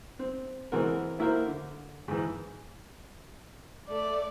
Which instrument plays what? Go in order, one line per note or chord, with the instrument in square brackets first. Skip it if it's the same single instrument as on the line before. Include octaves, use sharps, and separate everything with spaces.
[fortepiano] C4
E3 G#3 C4 F#4 A#4
A#3 E4 F#4 A#4 C5
D3
G#2 E3
[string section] A3 [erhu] D5